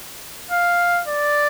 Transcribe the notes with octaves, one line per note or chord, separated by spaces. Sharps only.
F5
D5